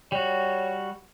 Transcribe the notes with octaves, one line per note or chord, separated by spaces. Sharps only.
G3 F#4 C#5